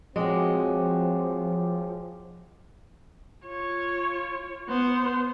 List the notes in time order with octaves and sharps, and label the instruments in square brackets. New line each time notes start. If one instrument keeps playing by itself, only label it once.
[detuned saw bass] F3 [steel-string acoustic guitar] G#3 F#4 [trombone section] C4 [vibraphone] C#5 G5 D6
[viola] F4 C#5
B3 C5